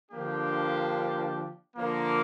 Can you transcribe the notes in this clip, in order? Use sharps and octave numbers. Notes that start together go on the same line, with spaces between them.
D3 F3 A#3 D4 G4
D3 F3 A#3